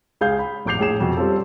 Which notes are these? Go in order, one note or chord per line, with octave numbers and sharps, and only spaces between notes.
C#2 G#4 F5 G6
B5
A1 F2 D6 G6 C7 F7
A#1 A2 G#4 E7
F2 B2
G3 C4 C#4 F4 A4